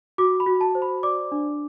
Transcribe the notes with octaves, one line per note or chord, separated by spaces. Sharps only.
F#4 D6
B5
F#4
A5
C5
B5
D5 D6
D4